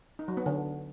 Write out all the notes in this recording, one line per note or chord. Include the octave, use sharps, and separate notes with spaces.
D#4
F#3
B3
D3